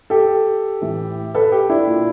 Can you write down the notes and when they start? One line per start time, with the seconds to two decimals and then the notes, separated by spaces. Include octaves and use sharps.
0.10 G4 A4
0.81 A2 E3
1.35 A4 B4
1.52 G4 A4
1.70 D4 E4
1.87 A#2